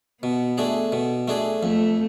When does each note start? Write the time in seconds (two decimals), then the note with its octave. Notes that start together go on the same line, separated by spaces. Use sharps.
0.22 B2 B3
0.58 A3 D4 G#4
0.92 B2
1.28 A3 D4 G#4
1.63 F2 A3